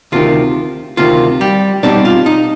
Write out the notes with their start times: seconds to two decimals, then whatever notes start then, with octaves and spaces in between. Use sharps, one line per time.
0.12 D2 C3 D#3 F4
0.97 D2 C3 D#3 F4
1.41 G3 G4
1.83 B2 G3 C4 D4 D#4 D5
2.05 F4
2.26 D#4